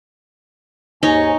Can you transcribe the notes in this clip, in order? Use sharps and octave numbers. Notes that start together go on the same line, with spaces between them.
D#2 G#2 D#4 C#5 G#5